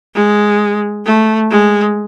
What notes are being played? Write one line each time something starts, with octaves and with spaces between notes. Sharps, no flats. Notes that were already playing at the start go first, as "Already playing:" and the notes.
G#3
A3
G#3